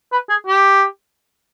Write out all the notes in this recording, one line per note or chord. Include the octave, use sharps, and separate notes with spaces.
B4
G#4
G4